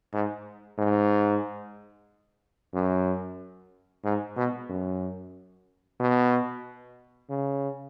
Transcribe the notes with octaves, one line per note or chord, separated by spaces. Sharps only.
G#2
G#2
F#2
G#2
B2
F#2
B2
C#3